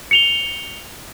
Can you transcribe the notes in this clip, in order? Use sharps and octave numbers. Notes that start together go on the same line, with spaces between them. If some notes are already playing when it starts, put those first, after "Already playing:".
C#7 F7 G7